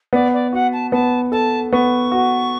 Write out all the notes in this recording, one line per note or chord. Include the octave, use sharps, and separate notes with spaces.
B3 D5
D5
F#4 F#5
A5
B3 A5
A4 A5
B3 C#6
F#4